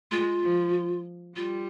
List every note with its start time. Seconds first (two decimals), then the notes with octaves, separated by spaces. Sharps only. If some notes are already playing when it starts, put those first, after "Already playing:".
0.11 G#3 F4
0.43 F3
1.36 G3 F4